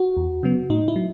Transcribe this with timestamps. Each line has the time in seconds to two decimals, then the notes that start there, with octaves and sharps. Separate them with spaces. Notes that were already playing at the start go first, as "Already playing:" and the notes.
Already playing: F#4
0.17 E2
0.43 C#3 F#3 B3
0.70 A2 D#4
0.88 E4
0.96 F#3